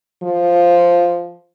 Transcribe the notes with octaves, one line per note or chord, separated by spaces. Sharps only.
F3